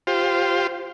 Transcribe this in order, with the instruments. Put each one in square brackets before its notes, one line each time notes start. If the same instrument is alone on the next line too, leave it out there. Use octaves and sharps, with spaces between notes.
[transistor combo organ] F4 G4 C5